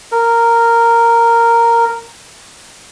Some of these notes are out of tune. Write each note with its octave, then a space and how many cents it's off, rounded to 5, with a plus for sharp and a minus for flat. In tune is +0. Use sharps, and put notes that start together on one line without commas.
A#4 -10